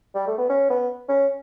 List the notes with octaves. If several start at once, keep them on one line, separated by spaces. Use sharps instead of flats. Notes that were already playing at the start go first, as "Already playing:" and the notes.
G3
A3
B3
C#4
B3
C#4